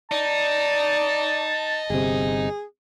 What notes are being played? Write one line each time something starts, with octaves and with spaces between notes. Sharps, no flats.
D#4 D5 A5
G1 C3 G#4